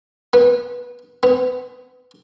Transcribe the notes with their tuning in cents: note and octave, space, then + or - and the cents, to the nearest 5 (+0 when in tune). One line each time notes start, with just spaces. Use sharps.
B3 -20
B3 +25